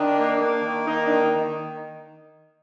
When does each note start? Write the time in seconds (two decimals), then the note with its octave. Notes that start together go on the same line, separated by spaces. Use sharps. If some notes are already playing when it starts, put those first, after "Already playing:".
Already playing: D#3 D4
0.17 A#3
0.40 A#3
0.64 D#3
0.87 A#3 D#4
1.05 D4
1.11 D#3
1.23 D#4
1.35 D#3